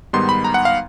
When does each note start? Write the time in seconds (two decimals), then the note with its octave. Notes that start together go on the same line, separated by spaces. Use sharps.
0.13 G#2 D#3 G3 B3 D#4 C6
0.29 B5
0.44 A#5
0.54 F#5
0.65 F5